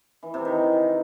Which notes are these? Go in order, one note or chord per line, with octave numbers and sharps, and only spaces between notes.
E3
C3
D#3